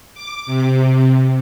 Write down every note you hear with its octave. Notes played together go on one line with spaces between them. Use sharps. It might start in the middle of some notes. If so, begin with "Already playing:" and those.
D6
C3